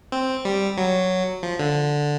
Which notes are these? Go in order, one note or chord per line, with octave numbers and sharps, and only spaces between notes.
C4
G3
F#3
F3
D3